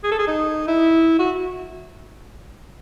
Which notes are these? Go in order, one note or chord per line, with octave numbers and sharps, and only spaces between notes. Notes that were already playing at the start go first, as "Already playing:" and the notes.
G#4
A4
G#4
D#4
E4
F#4